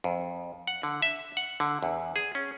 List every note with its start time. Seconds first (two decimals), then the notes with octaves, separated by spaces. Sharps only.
0.04 F2
0.67 F#5
0.83 D3
1.02 E5
1.37 F#5
1.60 D3
1.83 E2
2.16 G#4
2.35 C#4